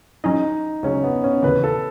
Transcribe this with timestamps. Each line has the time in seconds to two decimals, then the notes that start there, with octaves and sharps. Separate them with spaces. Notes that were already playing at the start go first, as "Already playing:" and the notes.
0.24 F#3 C#4 D#4 G#4 D#5
0.83 C#2 C#3 F#3 C#4
1.04 B3
1.24 C#4
1.43 D#2 C#3 E3 B4
1.64 A4